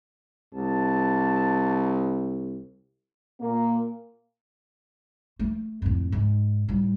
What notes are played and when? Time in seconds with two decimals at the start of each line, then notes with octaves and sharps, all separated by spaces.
0.55 C2 A5
3.41 A#2 A#3
5.39 A3
5.82 F2 A2
6.12 G#2
6.68 A2 G3